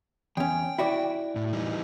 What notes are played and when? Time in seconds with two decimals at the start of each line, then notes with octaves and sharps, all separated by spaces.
0.37 E2 C#4 G5
0.79 E4 F#4 D5
1.36 A2
1.53 E3 G3 D#4